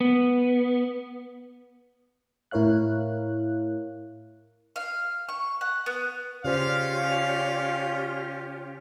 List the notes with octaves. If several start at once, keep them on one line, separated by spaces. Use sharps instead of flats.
B3
A2 E4 A#4 C#5 F5 F#6
F5
C#6
F#5
B3
C#3 C#4 F4 G4 C5 D5 F5